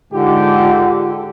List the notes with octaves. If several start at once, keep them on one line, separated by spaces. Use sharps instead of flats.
G#2 D3 G#3 F4 G4